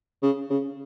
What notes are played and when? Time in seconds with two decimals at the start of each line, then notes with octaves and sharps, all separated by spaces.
0.22 C#3
0.50 C#3